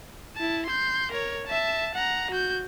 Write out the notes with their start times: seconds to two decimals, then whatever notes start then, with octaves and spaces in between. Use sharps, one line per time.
0.36 E4 A5
0.66 C6 G6
1.12 A#4 C#5
1.47 E5 A5
1.95 F#5 A#5
2.31 F#4 G6